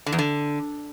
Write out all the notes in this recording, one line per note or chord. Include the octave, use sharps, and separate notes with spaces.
D3
E2
D3